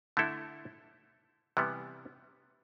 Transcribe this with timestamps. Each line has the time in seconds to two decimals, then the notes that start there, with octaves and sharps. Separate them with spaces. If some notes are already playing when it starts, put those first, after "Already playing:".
0.17 D3 A3 E4 A4
1.57 C3 E3 G3 B3